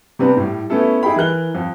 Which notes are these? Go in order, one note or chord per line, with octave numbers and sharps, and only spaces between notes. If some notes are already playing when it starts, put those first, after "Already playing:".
C3 G3 B3 C4 D4 B4
A2 G3
A3 B3 C#4 E4 A4
D#4 E4 G#4 G5 B5
E3 A#4 F#6 G7
F2